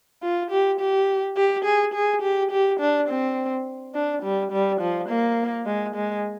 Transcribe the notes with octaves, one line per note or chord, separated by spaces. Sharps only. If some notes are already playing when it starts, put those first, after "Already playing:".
F4
G4
G4
G4
G#4
G#4
G4
G4
D4
C4
D4
G3
G3
F3
A#3
G#3
G#3